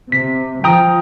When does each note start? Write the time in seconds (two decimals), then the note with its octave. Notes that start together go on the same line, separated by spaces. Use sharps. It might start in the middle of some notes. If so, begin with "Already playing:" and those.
0.12 C3 B6
0.64 F3 G5 A#5 D#6